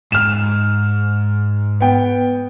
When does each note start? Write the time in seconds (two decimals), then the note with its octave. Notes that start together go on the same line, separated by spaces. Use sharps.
0.12 G#2 F6 E7
1.81 B3 G5